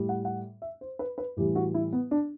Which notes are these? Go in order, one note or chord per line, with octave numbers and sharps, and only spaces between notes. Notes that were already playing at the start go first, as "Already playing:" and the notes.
Already playing: A2 G3
F#5
F#5
E5
C5
B4
B4
A2 E3 G3 G4
F#4
E4
B3
D4